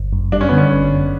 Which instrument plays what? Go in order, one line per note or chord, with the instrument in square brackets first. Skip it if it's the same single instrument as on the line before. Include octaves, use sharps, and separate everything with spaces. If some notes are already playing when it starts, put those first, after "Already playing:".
Already playing: [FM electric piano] G1
F#2
[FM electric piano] G3 [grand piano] D4
[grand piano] C#4
[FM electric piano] D3 [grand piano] B3
[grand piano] C#4
[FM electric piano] G1
F#2